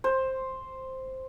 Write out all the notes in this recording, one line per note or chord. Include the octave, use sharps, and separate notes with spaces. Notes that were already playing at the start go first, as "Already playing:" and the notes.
C5